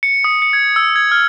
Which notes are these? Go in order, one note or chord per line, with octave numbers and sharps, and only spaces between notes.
C#7
D#6
C#7
G#6
E6
G#6
F6